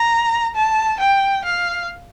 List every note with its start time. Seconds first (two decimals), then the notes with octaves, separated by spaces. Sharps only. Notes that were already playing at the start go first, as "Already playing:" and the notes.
Already playing: A#5
0.56 A5
1.00 G5
1.45 F5